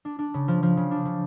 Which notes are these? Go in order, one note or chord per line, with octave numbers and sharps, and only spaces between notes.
D4
D4
C#3
F3
F3
C#3
D4
C#3